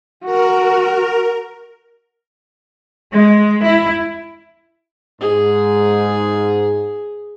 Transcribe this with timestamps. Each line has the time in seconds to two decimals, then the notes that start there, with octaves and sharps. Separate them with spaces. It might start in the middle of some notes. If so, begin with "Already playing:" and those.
0.25 F#4 A#4
3.12 G#3
3.63 E4
5.21 G#2 G#4